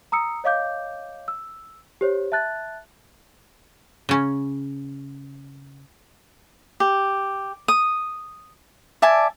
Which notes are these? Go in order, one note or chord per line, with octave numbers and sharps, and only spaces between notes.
A#5 D#6 E6 C#7
C#5 D#5 F5 D6 G6
E6
G4 C5 C#5
E5 A5 F#6 A6
C#3 C#4
G4
D#6
D5 E5 G#5 A5